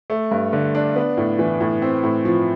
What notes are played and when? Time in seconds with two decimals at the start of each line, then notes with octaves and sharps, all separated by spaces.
0.10 A3
0.31 G2
0.53 D3
0.75 D4
0.96 B3
1.17 A2
1.39 E3
1.61 A2
1.82 C4
2.03 A2
2.25 F3